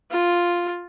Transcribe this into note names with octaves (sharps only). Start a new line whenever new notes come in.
F4